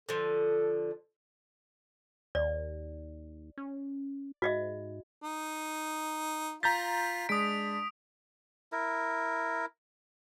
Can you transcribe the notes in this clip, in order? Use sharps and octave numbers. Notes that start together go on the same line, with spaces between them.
D3 F3 A4
D#2 D5
C#4
G#2 F#4 D#5 E5
D#4
F4 A#5 G6 A6 B6
G#3 D4 D#6 B6 D7
E4 A#4